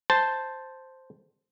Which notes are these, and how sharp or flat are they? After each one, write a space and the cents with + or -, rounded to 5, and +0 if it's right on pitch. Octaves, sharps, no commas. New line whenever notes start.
C5 +0 A5 +0